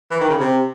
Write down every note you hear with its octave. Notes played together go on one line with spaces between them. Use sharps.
E3
D#3
C#3
C3